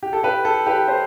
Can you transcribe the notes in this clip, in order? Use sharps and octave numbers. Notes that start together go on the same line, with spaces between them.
G4
A4
G4 B4
A4
G4 B4
A4 C5